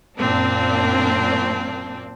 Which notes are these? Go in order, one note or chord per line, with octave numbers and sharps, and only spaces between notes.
F#2 A#2 A#3 C4 D4